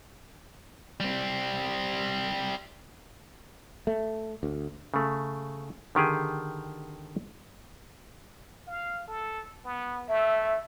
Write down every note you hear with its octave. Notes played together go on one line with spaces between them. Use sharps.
G3 C4
A3
D2
C#3 A3
D3 D#3 G4 G#4
F5
A4
B3
A3 E5